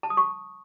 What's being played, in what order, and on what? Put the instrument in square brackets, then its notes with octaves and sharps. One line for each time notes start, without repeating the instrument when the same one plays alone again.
[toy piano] A5
D#6
C#6